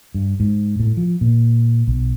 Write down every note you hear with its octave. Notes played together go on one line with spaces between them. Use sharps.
G2
G#2
A2
F3
A#2
B1